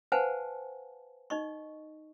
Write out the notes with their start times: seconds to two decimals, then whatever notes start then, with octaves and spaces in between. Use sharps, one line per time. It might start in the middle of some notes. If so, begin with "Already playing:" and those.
0.12 B4 C5 F5 F#5 G#5 A5
1.30 D#4 D#5 C#6